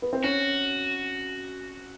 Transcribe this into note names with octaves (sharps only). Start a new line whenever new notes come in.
B3
C4
C#4 F#4